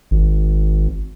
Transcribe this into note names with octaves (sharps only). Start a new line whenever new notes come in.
G#1